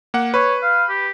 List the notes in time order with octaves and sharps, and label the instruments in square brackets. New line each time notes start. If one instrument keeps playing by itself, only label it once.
[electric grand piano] A#3 F#5
[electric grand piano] B4 [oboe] C#5
[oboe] F5
G4